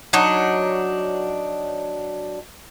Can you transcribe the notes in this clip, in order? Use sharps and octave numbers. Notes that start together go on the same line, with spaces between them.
F#3 D4 D#4 C#5